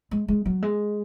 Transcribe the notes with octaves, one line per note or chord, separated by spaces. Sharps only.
G#3
G#3
F#3
G#3